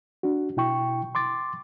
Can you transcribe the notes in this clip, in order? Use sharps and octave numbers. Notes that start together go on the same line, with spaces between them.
D4 F#4
B2 E4 G5 C#6
C6 D6 A6